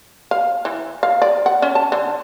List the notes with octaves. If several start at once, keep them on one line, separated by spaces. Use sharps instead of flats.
F5
E3
F5
D5
F#5
C#4
A5
D3